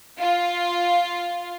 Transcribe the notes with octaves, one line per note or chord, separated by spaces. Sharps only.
F4